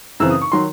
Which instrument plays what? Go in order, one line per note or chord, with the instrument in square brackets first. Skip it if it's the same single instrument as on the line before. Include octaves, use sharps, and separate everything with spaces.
[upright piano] F#2 C#3 E3 C4 E6
D#6
C#6
D#3 F#3 C6